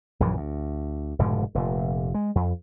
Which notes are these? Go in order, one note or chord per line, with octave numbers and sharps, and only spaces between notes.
A#1 F#2 C#3 E3
D2
F1 G#2 B2 D3
F1 A#2
G#3
F2